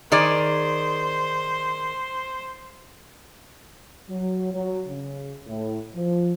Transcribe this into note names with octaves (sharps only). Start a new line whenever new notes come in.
D#3 G#4 C5 D5
F#3
F#3
C#3
A2
F3